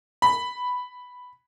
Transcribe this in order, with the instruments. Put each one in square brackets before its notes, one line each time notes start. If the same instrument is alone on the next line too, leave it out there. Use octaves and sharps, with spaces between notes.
[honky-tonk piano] B5